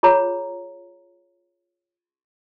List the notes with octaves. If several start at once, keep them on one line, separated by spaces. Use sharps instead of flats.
F4 G#4 C#5 A#5